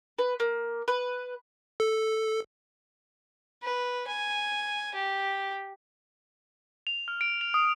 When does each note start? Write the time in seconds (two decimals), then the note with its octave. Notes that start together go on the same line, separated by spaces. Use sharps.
0.19 B4
0.40 A#3
0.88 B4
1.80 A4
3.63 B4
4.07 G#5
4.94 G4
6.87 F7
7.08 F6
7.21 D7
7.41 F7
7.54 D#6